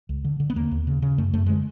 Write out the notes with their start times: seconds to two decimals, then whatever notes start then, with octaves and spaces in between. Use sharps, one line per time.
0.09 C#2
0.25 D3
0.40 D3
0.50 B3
0.56 D#2 A#3
0.71 D#2
0.87 C#3
1.02 C#3
1.18 F#2 A3
1.33 F#2 A3
1.46 D3 G#3